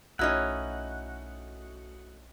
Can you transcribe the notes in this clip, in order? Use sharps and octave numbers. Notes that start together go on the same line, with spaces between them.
B1 A3 C#4 D#4 E4 F#4 D#5 F#5